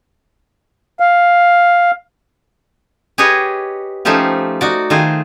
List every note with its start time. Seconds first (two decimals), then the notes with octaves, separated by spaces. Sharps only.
1.00 F5
3.18 G4 G#4 B4 C#5 D#5
4.05 F3 A3 C#4 D#4 F4 G4
4.61 D#4 F#4 D5
4.90 D#3 A3 F4 G#4 C5